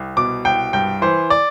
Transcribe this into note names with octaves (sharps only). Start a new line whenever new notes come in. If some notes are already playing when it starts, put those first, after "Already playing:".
Already playing: C2
B2 D6
C2 G5
G2 G5
E3 C5
D5